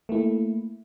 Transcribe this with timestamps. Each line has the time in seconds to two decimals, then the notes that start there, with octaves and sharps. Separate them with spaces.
0.09 A3 A#3 E4